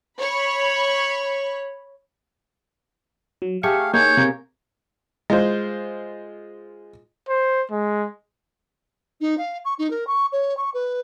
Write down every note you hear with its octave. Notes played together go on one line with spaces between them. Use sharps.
C#5 B5
F#3
A3 G4 G#4 F5 C#6
A#3 D#4 G#4 C#5 G6
C3 A#3
G#3 F4 C5
C5
G#3
D#4
F5
C#6
D#4
A#4
C#6
C#5
C#6
B4